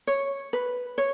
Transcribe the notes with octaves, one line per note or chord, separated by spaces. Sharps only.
C#5
B4
C#5